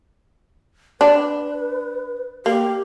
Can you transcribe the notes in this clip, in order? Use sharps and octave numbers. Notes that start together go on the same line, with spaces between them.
D4 B4
A#3 G4